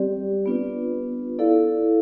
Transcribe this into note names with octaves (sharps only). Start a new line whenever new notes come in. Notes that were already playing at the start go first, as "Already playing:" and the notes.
Already playing: G3 C4 G4 D5
B3 D4 F4 B4
E4 A4 D5 F5